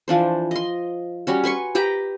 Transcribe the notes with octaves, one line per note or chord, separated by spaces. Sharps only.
E3 F3 D4 C5
D#5 C6
G3 C#4 F#4
B4 G#5 C6 C#6
G4 B4 G5 A#5